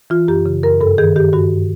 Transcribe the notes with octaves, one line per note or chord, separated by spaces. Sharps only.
E3 F4
F#2 G4
C#3
F#2 A#4
G2 A4
D#3 G#4
D#3 G4
G2 F#4